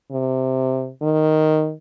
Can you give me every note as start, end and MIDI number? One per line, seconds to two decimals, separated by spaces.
0.11 0.89 48
1.02 1.72 51